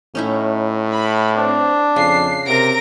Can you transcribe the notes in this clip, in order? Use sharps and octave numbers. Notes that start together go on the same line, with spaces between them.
A2 C#4 D#4 E4
B5
C4 D4
F2 C#3 C7
C3 A#4 A#6 D7